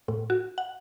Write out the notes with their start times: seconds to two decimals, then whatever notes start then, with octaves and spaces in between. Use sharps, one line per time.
0.08 A2
0.30 F#4
0.58 F#5